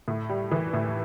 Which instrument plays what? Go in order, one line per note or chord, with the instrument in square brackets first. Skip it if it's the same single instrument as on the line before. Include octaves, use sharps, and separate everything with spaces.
[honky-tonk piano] A2
G3
E3
A2